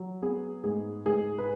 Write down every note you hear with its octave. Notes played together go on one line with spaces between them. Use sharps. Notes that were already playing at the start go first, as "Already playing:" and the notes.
Already playing: F#3
B3 G#4
G#2 G#4
G#2 G#4
B4